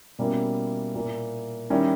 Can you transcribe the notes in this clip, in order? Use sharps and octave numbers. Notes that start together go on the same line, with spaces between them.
B2 G3 A#3 C#4 E4
A#2 A#3 E4
D#3 G3 C#4 E4